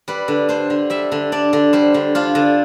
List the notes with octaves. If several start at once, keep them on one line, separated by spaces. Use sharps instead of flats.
G3 B4
D3
D4 C5
D3
G3 E5
D3
D4 D5
D3
G3 C5
D3
D4 F4
D3